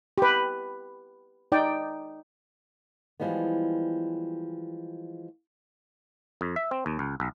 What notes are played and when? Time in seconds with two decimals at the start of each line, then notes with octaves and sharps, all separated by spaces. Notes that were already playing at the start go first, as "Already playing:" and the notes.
0.18 G4 B4
1.52 D#4 D5 G5
3.20 E3 F3 G3 G#3 B3
6.41 F2
6.56 E5
6.71 C4
6.86 D#2
6.99 C#2
7.20 B1